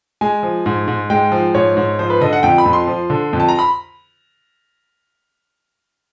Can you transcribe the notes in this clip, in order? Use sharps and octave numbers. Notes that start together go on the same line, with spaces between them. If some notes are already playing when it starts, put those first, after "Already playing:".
G#3 G#5
F3
G#2
G#2
G#3 G5
F3
G#2 C#5
G#2
F3 C5
B4
D3 D#5
F#5
F2 G5
B5
F2
C6
F3
D3
F2
A5
A#5
B5